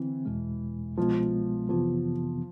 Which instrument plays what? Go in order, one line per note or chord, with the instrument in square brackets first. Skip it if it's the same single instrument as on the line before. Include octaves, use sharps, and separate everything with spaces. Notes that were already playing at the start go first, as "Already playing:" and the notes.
Already playing: [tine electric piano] D3 C4 [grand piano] E3
[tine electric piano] E2 B2 G#3
[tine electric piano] C2 B2 G#3 B3 [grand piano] F3
[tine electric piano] F2 C3 E3 B3 [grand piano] F3